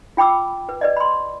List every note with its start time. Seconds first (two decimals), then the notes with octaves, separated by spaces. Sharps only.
0.17 F4 G5 B5 D6 E6
0.69 B4
0.81 B4 D5 D#5
0.97 B5 C6